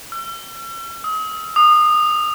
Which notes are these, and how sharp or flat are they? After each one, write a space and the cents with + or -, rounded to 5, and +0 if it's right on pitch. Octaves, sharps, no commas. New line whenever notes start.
E6 +45
D#6 +40
D#6 -30